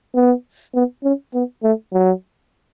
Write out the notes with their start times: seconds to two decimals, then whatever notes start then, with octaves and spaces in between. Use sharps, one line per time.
0.15 B3
0.74 B3
1.04 C#4
1.34 B3
1.63 A3
1.93 F#3